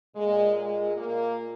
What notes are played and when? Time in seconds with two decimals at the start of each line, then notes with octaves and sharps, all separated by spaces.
0.16 A#2 G#3
0.56 G#3
0.96 A#2 A#3